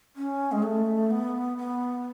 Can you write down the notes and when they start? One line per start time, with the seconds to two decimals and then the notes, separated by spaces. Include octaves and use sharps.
0.16 C#4
0.52 G#3
0.63 A3
1.10 B3
1.57 B3